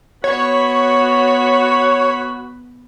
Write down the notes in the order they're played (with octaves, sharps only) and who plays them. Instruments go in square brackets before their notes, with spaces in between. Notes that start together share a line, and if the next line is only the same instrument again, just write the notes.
[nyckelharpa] B3 B5 [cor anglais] F#4 [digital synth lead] C#5